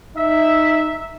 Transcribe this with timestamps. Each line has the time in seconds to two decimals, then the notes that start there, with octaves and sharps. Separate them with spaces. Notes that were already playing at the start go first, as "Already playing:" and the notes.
0.16 D#4 E5